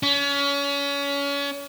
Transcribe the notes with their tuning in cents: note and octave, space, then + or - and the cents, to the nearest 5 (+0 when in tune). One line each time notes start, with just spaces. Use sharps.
C#4 +30